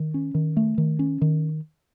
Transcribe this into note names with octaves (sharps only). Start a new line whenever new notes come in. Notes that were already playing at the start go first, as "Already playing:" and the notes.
Already playing: D#3
C#4
D#3
A3
D#3
C#4
D#3